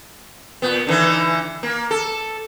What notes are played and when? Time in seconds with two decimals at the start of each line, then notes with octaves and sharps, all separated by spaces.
0.62 A#2 B3
0.87 D3 E3 D#4
1.63 A#3
1.91 A4